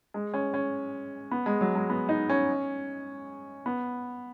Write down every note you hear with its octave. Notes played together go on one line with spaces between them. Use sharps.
G#3
C#4
C#4
B3
G#3
F#3
G#3
B3
D#4
C#4
B3